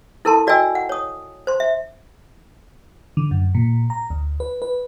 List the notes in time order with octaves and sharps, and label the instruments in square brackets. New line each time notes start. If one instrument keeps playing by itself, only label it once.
[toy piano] E4 A4 A#4 A5 C6
F#4 D5 D#5 G5 G#5 E6
F#5
C#5 D#6
C5 C6
E5
[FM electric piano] D3
F#2
A#2
A#5
D2
B4
B4